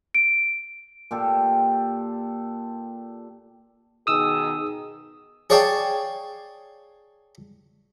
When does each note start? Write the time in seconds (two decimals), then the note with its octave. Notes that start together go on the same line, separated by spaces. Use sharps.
0.15 D7
1.11 A#2 G4 A4
4.07 B2 D#3 G#4 D#6 E6
5.50 G#4 C#5 D5 F5 G5 A5